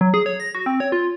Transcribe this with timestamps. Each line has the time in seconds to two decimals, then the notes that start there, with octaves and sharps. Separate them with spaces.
0.01 F#3
0.14 G#4
0.26 C#5
0.40 A#6
0.55 F#4
0.66 C4
0.80 C#5
0.92 F4